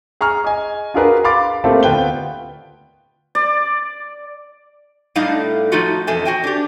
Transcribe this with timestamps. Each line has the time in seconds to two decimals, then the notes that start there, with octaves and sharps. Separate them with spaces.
0.21 G#4 A#5 C#6 F6
0.44 D#5 G#5
0.94 D4 F4 F#4 G#4 A#4 B4
1.24 F5 B5 C6 D6 A6
1.64 A3 A#3 C4 F4 G4 A4
1.83 D2 B3 F4 B4 G5 G7
3.35 D5
5.16 A2 G3 A3 D4 D#4 F5
5.72 F3 A3 D#4 F4 F#4
6.07 F2 B2 E3 A4 E5 G#5
6.25 F#4 C5 G5 G#5
6.44 D4 G4